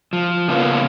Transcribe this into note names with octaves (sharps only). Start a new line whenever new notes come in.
F3
C#3 A#3 B3 C#4 F4